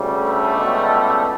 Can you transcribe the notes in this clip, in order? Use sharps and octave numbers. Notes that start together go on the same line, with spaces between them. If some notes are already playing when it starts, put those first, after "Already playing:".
Already playing: D2 C#3 G3
A3
C#2 B2 G3